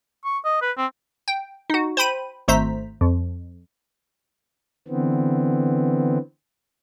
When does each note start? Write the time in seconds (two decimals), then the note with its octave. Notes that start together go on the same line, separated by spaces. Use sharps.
0.25 C#6
0.44 D#5
0.62 B4
0.78 C4
1.28 G5
1.70 D#4 F#4
1.97 C5 G5 B5 D#7
2.48 G#1 A3 C5 A#5 B6
3.01 F2
4.88 D3 E3 B3 C4